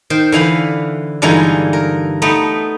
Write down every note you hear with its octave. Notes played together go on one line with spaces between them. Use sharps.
D#3 C5
D3 E3 F5 B5
G2 D3 E3 G#3 D#4 F4
A#4
A3 B3 D#4